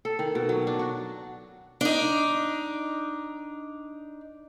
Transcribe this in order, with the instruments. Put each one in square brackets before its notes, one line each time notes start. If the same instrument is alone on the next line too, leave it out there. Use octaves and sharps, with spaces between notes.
[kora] A4
D#3
B2
F#3
D4
F#4
[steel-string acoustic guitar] D4 D#4